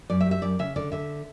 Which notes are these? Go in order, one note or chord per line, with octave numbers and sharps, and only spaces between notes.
F#2 D5
E5
G3
E5
F#2 D5
C#3 E5
D3 D5
D3 E5